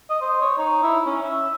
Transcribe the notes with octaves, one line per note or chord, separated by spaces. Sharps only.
D#5
C5
C#5
D#4
E4
C#4
E5